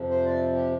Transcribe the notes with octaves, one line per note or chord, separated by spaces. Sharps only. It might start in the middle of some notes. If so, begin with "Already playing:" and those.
Already playing: F2 C3 F3
C5
D5
G4